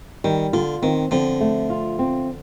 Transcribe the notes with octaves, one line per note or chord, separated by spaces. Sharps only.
D#3 G3
D3 F4
D#3 C4
D3 F3 C4
A3
F4
C4